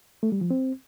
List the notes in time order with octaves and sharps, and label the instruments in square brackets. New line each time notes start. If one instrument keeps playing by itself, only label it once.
[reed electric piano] A3
G3
F3
C4